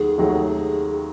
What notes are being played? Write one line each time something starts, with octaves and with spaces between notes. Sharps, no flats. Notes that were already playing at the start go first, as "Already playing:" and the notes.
Already playing: D#2 D#3 F#3 A3 G#4
D#2 D#3 F#3 A3